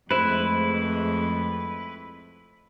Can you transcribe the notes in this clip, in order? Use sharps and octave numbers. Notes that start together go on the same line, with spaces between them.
F2 G#3 A3 E4 B4 C5